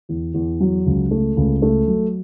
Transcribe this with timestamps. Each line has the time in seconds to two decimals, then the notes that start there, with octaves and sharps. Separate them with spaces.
0.09 E2
0.34 E2
0.60 F#3
0.86 C#2
1.11 A3
1.37 C#2
1.62 A3
1.88 F#3